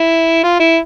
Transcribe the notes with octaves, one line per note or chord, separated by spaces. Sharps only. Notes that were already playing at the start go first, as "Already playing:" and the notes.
Already playing: E4
F4
E4